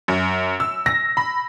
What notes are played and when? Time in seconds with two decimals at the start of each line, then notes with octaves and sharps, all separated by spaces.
0.08 F#2
0.60 E6
0.86 A#6
1.17 B5